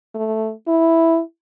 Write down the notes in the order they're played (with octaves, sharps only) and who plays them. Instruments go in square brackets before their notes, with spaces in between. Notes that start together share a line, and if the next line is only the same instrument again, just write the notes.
[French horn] A3
E4